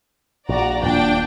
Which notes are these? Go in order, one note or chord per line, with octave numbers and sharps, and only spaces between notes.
A#1 F#4 D5 A#5
D#1 A#2 D4 G5